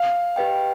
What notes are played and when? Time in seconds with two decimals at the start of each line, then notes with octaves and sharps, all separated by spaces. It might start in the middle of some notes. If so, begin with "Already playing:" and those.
Already playing: F5
0.36 G4 B4 D#5 G5